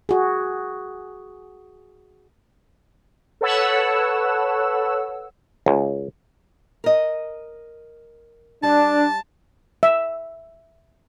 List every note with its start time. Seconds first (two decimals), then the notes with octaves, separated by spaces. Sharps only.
0.09 F#4 G#4
3.41 A4 B4 C#5 F#5 E6
5.66 C#2
6.84 A#4 D#5
8.63 G3 D4 A5
9.83 E5